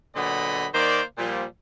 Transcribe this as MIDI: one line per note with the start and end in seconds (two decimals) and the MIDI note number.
0.16 0.67 46
0.16 0.67 50
0.16 0.67 54
0.16 0.67 59
0.16 0.67 75
0.16 0.67 83
0.74 1.02 51
0.74 1.02 58
0.74 1.02 72
0.74 1.02 74
1.18 1.44 46
1.18 1.44 53
1.18 1.44 55